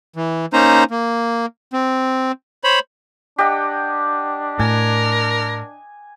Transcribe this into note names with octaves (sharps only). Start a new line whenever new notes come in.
E3
A#3 C#4 D#4 C5 A#5
A#3
C4
C5 C#5 B5
D4 G4 D#5 F#5
A2 A#4 G#5